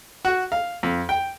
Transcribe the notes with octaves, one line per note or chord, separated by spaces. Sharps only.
F#4
F5
F2
G5